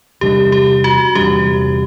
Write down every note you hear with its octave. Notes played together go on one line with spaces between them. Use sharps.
E2 C3 G3 D4 G4
G4
F#4
E2 C3 G3 D4 G4